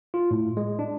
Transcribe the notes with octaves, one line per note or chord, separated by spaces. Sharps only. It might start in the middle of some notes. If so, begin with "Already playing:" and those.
F4
A2
G#3
D4